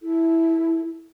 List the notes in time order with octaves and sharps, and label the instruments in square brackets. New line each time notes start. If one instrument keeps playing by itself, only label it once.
[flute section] E4 A4